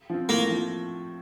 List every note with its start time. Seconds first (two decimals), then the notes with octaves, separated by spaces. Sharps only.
0.10 F3 C4
0.29 A2 A#3
0.50 F3